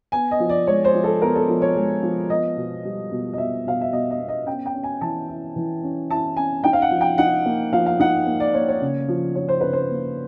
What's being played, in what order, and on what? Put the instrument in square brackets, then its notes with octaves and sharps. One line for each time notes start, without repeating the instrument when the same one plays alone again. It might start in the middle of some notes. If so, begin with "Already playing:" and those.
[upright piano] B3 G#5
D#5
F3
D5
G#3 C#5
C5
F3
A4
B3 A#4
A4
F3
C#5
G#3
F3
B3 D#5
B2
G3
B2
D#5
B2 E5
B2 F5
E5
B2 D#5
D#5
B3
D#5
C#4 G5
G5
C#4
G#5
E3 A5
E4
E3
C#4
E4 A5
C#4 G#5
D#4 G5
F5
F#5
F3
G5
D#4 F#5
A#3
F3 F5
F5
D#4 F#5
A#3
D5
A#3 C#5
C#5
C#3
F3
F3 C#5
C5
C#3 B4
C5
A#3